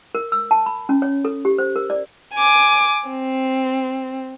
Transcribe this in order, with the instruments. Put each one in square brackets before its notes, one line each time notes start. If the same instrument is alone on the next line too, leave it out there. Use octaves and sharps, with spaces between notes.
[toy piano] A#4
E6
A5
B5
C#4
C#5
A4
G4
C5
A#4
D5
[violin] G#5 D6
C4